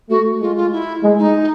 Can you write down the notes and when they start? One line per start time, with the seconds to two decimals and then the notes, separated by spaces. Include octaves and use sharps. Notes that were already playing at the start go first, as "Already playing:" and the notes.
0.10 A3 F#4
0.41 G#3 F4
0.56 F4
0.72 E4
1.03 G#3
1.19 D#4